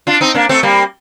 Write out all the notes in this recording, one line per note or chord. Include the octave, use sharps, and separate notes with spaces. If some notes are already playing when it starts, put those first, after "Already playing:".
D4 F4
C4 D#4
A#3 D4
A3 C4
G3 A#3